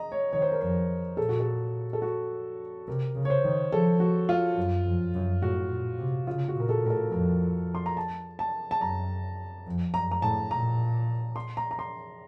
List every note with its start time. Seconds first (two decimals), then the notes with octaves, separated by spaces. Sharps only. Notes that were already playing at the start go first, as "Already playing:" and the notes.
Already playing: D#5 A#5
0.12 C#5
0.33 D#3 C#5
0.42 C5
0.52 A#4
0.61 F2 C5
1.17 A#2 A4
1.29 F#4
1.40 A4
1.93 A4
2.02 F#4
2.87 C3 A#4
3.15 C#3
3.25 C#5
3.30 C5
3.45 D#3
3.72 F3 A4
4.00 F#4
4.29 F4
4.57 F#2
4.85 F2
5.14 F#2
5.42 A2 F#4
5.70 A#2
5.98 C3
6.27 C#3 F4
6.48 F#4
6.56 A#2
6.60 A#4
6.69 A4
6.83 A2 A#4
6.90 A4
7.11 F2 A#4
7.75 C6
7.86 A#5
7.97 A5
8.39 A5
8.71 A5
8.81 F#2 A#5
9.67 F2
9.94 F#2 A#5
10.11 A#5
10.22 A2 A5
10.51 A#2 A#5
11.36 C6
11.57 A#5
11.71 A#5
11.79 C6